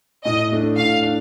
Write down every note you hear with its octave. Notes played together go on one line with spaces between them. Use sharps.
A2 D#5
A3 D4
A2 F5
D4